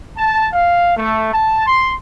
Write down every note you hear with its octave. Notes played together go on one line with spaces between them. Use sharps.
A5
F5
A3
A5
C6